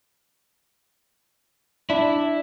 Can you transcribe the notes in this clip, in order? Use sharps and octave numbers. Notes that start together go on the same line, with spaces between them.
D4 E4